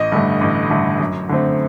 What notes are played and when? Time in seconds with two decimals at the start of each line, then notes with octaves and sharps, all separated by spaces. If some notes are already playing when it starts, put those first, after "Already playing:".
Already playing: A1 D#5
0.12 G2 D3 A3
0.41 A1
0.70 G2 D3 A3
1.00 F#2
1.29 D3 A3 C4